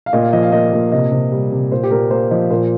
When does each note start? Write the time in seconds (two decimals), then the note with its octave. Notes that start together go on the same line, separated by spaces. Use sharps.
0.06 F5
0.13 A#2 D#5
0.22 F5
0.33 F3 D#5
0.43 F5
0.52 A#3 D#5
0.73 A#2
0.92 C3 D#5
1.11 C3
1.32 G3
1.51 C3
1.72 A#2 C5
1.83 G4
1.91 A#2 A#4
2.11 A#3 C5
2.31 F3 D#5
2.51 A#2 C5